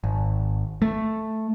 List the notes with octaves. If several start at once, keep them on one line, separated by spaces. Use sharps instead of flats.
G#1
A3